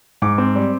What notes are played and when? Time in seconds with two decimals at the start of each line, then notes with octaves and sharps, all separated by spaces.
0.22 G#2 D6
0.38 C4
0.55 G3